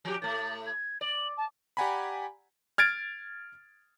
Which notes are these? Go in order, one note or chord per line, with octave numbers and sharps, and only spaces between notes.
F3 G4
A2 A3 A6
G#6
D5 F#7
A5
G4 D5 F#5 G#5 A#5 B5
F6 G#6 A6 D7